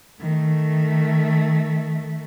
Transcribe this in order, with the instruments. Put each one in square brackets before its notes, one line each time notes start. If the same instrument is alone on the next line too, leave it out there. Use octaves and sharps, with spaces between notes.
[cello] D#3 A3